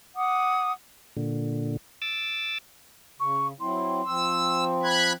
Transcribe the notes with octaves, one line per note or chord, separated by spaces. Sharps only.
F#5 D6 D#6
A#2 D3
D6 E6 A6
C#3 C#6
F#3 C4 E4 C6
F3 C4 E6
B5 F#6 G#6